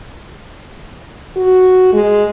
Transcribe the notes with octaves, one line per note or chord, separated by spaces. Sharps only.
F#4
G#3